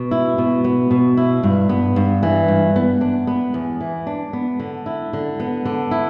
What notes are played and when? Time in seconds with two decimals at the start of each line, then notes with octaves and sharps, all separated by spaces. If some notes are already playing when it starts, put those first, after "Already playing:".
Already playing: B2
0.11 E4
0.38 B2
0.64 B3
0.91 B2
1.17 E4
1.43 G2
1.69 B3
1.96 G2
2.23 E3
2.48 G2
2.76 B3
3.01 D4
3.27 B3
3.54 E2
3.81 E3
4.07 D4
4.33 B3
4.59 D3
4.86 E4
5.13 D3
5.40 B3
5.65 D3
5.91 E4